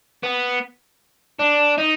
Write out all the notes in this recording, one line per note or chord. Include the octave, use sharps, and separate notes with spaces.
B3
D4
D#4